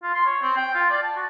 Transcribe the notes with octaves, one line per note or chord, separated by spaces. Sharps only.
F4
C6
C#5
C4
G5
F4
D5
A5
F#4